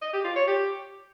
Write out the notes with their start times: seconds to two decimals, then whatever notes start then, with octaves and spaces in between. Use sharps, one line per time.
0.02 D#5
0.13 G4
0.24 F4
0.36 C#5
0.47 G4